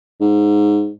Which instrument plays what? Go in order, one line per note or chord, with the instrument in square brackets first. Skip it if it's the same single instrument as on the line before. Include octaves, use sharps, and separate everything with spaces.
[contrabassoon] G#2